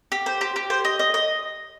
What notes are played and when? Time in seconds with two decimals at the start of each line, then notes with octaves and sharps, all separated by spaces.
0.12 G4
0.26 C5
0.41 G4
0.56 G4
0.70 C5
0.85 D#5
0.99 D#5
1.14 D#5